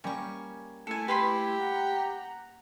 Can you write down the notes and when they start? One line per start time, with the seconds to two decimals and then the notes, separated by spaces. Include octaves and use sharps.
0.04 G3 A#3 C#4 G#5 C#6
0.87 A3 E4 A4 G#5 C#7
1.08 G4 B4 B5 C6
1.59 F#5 A#5